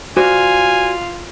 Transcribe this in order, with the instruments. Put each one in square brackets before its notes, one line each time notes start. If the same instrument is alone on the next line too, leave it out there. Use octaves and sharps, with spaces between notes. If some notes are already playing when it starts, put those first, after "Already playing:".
[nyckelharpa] F4 F5 [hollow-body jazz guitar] F#4 C5 D5 [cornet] G#5